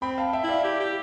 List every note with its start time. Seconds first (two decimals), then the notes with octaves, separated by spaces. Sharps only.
0.02 C4 G5 B5
0.18 F5 A5
0.33 E5 G5
0.44 E4
0.49 D5 F5
0.64 G4
0.80 G4